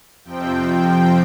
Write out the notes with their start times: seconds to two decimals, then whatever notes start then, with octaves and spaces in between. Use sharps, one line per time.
0.24 F2 C3 F3 C4 G5
0.82 G5